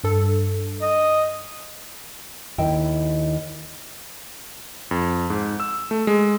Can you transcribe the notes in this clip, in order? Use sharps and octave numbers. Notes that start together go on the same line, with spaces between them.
G2 A4
D#5
D#2 D#3 E4 D#5 E5 G5
F2
G#2
E6
A3
G#3